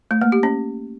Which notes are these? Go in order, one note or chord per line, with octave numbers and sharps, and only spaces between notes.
A3
A#3
G4
C#4